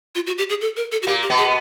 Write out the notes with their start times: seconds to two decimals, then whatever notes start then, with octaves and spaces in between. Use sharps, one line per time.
0.15 F4
0.27 F#4
0.38 G4
0.49 G#4
0.61 A4
0.77 A#4
0.92 A4
1.03 F#4
1.07 A#2 A#3 G4
1.23 G4
1.30 B2 B3
1.38 G#4